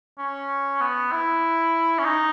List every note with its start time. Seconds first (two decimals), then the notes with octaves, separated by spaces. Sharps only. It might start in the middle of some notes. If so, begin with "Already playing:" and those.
0.18 C#4
0.81 B3
1.12 E4
1.99 C#4
2.05 D#4